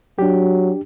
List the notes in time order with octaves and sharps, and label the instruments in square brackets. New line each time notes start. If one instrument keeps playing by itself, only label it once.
[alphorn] F#3 [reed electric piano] D4 G4